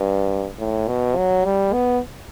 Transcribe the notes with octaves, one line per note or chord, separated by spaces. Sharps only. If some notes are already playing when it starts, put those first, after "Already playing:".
Already playing: G2
A2
B2
F#3
G3
B3